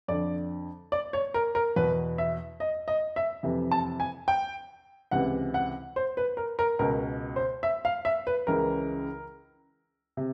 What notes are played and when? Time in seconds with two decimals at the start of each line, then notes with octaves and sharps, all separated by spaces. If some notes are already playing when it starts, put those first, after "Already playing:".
0.08 F2 D3 D5
0.92 D5
1.13 C#5
1.34 A#4
1.55 A#4
1.76 E2 B2 B4
2.18 E5
2.60 D#5
2.88 D#5
3.16 E5
3.43 F2 C3 E3
3.71 A5
4.00 G#5
4.28 G5
5.11 C#2 C3 E3 F#5
5.54 F#5
5.96 C5
6.17 B4
6.37 A#4
6.59 A#4
6.79 C#2 B2 A#4
7.36 C5
7.63 E5
7.85 F5
8.05 E5
8.27 B4
8.47 C#2 C#3 E3 A#4
10.17 C3